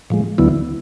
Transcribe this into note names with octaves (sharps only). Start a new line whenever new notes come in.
A2 F3 G#3
D2 D3 F#3 B3 E4